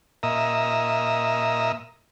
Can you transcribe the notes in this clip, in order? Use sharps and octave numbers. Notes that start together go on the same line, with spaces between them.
A#2 D#5 E5 A#5